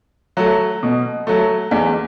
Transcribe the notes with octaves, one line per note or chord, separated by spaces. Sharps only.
F#3 A3
B2
F#3 A3
E2